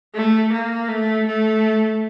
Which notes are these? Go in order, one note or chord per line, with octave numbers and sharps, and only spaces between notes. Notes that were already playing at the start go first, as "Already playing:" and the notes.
A3
A#3
A3
A3